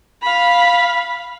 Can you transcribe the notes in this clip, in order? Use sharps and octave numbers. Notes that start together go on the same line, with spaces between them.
F5 B5